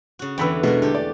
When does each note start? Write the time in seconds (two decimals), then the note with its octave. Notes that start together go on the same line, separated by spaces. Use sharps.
0.19 C#3 F#4
0.38 E2 D3 E3 G5 B5 E6
0.63 B2 G#3 A3 B3 A#4
0.82 D3 A3 G4
0.95 D5